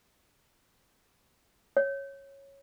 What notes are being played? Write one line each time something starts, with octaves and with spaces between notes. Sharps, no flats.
C#5